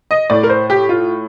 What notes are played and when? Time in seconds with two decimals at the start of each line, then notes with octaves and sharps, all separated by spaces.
0.11 D#5
0.30 A2 D5
0.43 A#4
0.49 C5
0.70 G4
0.89 F4